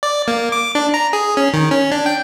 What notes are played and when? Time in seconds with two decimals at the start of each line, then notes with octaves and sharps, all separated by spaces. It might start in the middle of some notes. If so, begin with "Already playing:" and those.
0.03 D5
0.28 A#3
0.52 D6
0.75 D4
0.94 A#5
1.13 G#4
1.37 C#4
1.54 D#3
1.71 C#4
1.92 D4
2.06 G5